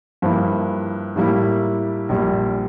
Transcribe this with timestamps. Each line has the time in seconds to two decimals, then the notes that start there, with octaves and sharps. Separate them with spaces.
0.22 G2 F3 A#3 E4
1.16 A2 G3 A#3 E4
2.09 A#1 A#2 G3